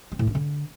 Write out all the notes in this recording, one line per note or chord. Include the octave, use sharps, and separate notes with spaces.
C4
A2
A#3
D3